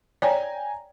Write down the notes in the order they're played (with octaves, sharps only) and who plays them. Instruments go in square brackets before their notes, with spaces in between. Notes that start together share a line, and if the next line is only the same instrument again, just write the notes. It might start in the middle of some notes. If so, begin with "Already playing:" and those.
[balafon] C#5 D5 [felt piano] G5 G#5 A#5